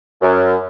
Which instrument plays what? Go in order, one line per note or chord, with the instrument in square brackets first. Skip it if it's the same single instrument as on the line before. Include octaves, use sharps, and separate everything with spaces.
[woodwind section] F#2